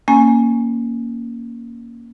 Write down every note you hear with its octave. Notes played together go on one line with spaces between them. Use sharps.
A#3 C#4 G#5